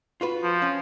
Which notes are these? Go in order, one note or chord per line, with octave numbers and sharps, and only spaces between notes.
F4 F#4 B4
F3
C#4